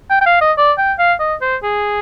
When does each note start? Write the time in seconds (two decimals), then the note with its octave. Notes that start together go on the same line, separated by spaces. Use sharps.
0.10 G5
0.21 G5
0.26 F5
0.41 D#5
0.58 D5
0.78 G5
0.99 F5
1.20 D#5
1.41 C5
1.63 G#4